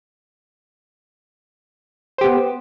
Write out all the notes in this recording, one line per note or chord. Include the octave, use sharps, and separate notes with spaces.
B3 G4 C5